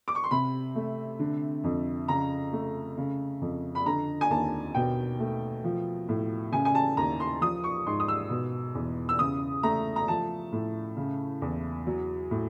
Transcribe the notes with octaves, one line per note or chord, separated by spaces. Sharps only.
D6
C#6
C6
C3 B5
A3
D3
F2
C#3 A#5
A3
C#3
F2
B5
D3 A#5
G#5
D#2 A5
B2 G5
A3
F3
A2
C#3 G#5
G#5
A5
D#2 A#5
C6
F3 D#6
C#6
G#2 C6
D#6
E6
B2
E2
E6
C#3 D#6
A3 A#5
A#5
F3 A5
A2
C#3
E2
F#3
A2